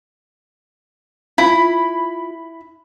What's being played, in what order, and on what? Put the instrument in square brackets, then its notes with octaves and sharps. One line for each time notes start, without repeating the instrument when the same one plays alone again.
[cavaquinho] E4 [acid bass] F4 [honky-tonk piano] B5